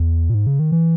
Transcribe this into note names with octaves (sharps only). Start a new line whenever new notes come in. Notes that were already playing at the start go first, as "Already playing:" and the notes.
Already playing: E2
A#2
G#2
C#3
D#3
E3